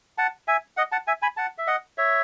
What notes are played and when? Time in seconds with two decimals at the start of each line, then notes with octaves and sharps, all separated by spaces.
0.18 F#5 A5
0.48 E5 G#5
0.77 D#5 F#5
0.92 F#5 A5
1.07 E5 G#5
1.22 G#5 B5
1.37 F#5 A5
1.58 E5
1.67 D#5 F#5
1.98 C#5 E5